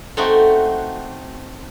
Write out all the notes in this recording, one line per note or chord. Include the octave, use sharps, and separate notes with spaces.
A3 C4 D#4 F#4